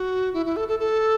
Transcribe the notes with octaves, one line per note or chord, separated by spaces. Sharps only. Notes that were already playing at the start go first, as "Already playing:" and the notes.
Already playing: F#4
E4
E4
A4
A4
A4